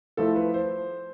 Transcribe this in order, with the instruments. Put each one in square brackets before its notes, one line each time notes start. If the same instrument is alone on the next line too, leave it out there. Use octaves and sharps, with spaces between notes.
[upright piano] F3 A3 E4 [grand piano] A4
[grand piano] B4
C5